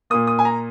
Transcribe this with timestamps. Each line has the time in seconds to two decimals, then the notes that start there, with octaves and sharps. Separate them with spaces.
0.10 A#2 A#3 D#6
0.27 D#6
0.39 G#5
0.45 A#5